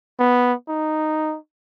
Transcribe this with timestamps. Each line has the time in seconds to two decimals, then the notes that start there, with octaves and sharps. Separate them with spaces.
0.19 B3
0.68 D#4